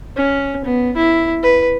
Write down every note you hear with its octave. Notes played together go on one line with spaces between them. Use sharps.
C#4
B3
E4
B4